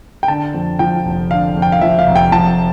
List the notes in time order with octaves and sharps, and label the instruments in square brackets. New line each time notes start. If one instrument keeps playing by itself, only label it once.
[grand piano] G5
D3 A5
F2
F3 G5
F1
D3 F5
F2
G5
F5
F3 E5
F5
F1
G5
F3 A5